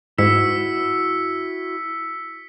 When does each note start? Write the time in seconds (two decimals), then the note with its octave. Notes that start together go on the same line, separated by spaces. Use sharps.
0.18 G#2 E4 F#4 E6 B6 C#7